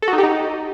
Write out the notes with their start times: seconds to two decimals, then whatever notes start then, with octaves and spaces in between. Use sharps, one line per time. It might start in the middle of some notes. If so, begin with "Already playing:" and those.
0.02 A4
0.08 F#4
0.13 D#4
0.18 G4
0.23 D#4